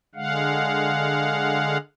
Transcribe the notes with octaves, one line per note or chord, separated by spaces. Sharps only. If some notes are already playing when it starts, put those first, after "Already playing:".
D3 G#3 F5 F#5